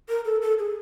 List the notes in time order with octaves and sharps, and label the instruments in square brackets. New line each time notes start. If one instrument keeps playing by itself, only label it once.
[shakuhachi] A#4
A4
A4
G#4